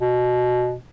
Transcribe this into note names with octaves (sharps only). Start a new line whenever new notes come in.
B2